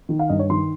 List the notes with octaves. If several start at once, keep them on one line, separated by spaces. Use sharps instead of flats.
D#3
F5
G2 D#5
C#5
D#3 C6